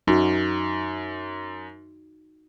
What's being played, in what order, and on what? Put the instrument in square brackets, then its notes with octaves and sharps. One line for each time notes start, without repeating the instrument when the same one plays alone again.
[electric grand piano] F#2 [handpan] D#4 F#4